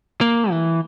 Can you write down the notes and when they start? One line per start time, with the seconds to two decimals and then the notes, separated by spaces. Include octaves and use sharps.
0.21 A#3
0.51 E3